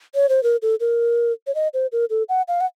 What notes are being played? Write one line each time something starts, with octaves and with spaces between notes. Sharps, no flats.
C#5
C5
A#4
A4
A#4
C#5
D#5
C5
A#4
A4
F#5
F5
F#5